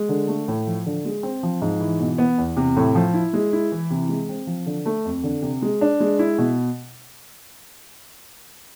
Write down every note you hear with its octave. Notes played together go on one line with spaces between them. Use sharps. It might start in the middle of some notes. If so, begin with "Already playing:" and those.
Already playing: G#3
D3
A3
A2
F3
D3
G#3
C4
F3
G#2
E3
B2
B3
E2
C3
A2
F3
E4
G#3
E4
E3
C3
G#3
C4
F3
D3
A3
F2
D3
C3
G#3
D4
G#3
E4
B2